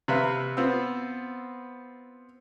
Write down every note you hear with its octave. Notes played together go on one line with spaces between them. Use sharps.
C3 B4 E5 F5
B3 C4 F4 E6